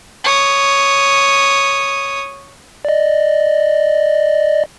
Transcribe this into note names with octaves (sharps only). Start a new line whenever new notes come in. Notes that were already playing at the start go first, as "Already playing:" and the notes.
C#5 D#6
D5 D#5